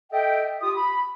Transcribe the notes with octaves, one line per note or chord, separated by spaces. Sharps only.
A4 D#5 E5 G5
F4 G4 D#6
B5